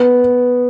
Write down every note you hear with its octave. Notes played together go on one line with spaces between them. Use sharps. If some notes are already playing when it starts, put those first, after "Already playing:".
Already playing: B3